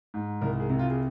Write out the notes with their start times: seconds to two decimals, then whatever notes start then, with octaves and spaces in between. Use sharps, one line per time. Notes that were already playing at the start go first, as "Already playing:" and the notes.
0.14 G#2
0.41 C2 A#4
0.60 G#4
0.69 C3
0.79 F4
0.89 G#4